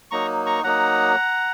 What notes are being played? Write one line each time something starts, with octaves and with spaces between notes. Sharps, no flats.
F#3 A#3 D#4 A#5 C#6
A#5 C#6
F#3 A#3 D#4 F#5 A#5